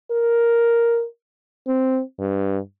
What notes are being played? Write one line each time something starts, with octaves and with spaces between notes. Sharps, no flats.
A#4
C4
G2